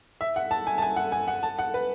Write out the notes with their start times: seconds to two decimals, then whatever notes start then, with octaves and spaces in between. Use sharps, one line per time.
0.21 E5
0.36 F#5
0.51 A5
0.67 G#5
0.78 A5
0.82 G#5
0.96 F#5
1.12 G#5
1.28 F#5
1.43 A5
1.59 F#5
1.74 B4